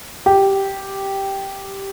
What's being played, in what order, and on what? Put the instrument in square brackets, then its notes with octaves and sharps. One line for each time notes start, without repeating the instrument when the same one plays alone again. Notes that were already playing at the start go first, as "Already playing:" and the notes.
[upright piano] G4